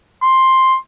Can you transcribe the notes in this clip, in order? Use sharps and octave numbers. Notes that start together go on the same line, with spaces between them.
C6